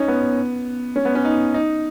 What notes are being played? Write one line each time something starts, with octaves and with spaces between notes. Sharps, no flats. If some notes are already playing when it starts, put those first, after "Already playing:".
Already playing: C#4 D#4
B3
C#4
B3
C#4
D#4
D#4